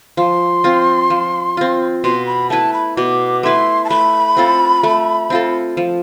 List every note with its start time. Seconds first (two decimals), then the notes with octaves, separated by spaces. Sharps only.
0.17 F3 C6
0.64 C4 F4
1.10 F3
1.57 C4 F4
2.04 B2 C6
2.27 B5
2.50 A3 E4 B4 A5
2.74 B5
2.97 B2 D6
3.43 A3 E4 B4 C6
3.84 A5
3.90 A3 B5
4.37 C4 F4 A4
4.83 A3
5.30 C4 F4 A4
5.77 F3